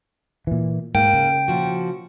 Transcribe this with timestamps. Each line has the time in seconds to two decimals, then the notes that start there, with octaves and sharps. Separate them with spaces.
0.47 A#2 E3
0.95 G#2 A#3 G5
1.13 C#3
1.48 A#2 F3 F#4